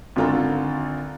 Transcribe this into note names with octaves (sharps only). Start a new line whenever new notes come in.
G#1 D3 F4 A4 A#5